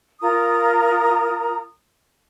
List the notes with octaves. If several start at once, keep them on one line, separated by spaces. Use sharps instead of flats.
F4 A#4 A#5 D#6